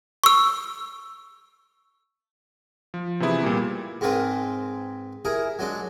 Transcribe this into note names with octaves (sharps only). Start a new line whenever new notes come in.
C#6 E6
F3
C3 E3 B3 E4 G#4
A#2 G3 A#3
G#2 G#3 C4 A#4 B4 C6
E4 G#4 A#4
F#3 G#3 D4